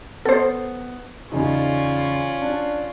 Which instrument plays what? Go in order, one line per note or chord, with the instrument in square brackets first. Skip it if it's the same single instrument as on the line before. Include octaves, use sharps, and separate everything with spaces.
[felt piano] B3 [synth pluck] A4 C5
[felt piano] E2 C#3 D#4 [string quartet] C#4 F4 D5
[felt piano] D4